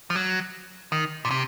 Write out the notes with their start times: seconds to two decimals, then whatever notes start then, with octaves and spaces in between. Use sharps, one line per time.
0.10 F3
0.15 F#3
0.92 D#3
1.25 A#2
1.31 C3